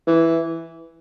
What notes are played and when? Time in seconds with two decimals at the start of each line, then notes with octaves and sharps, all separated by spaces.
0.07 E3